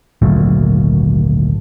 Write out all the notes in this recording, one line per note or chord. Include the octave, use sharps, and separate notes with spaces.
G#1 D2 A#2 F#3